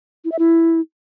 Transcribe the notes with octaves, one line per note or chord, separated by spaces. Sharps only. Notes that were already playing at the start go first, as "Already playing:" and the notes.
E4
E5
E4